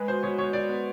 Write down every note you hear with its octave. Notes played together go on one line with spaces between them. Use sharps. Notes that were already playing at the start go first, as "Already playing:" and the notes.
Already playing: G#3 B4
B2 C5
B2 C#5
B2 C#5
B2 D5
B3